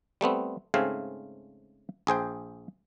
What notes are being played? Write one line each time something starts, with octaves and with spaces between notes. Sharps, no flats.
G3 A3 B3 C4
G#2 C#3 A3 C4 F5 G#5
A#1 G#4 C5 G5